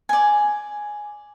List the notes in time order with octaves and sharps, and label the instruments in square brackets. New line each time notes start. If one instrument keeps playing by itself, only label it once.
[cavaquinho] D5 G#5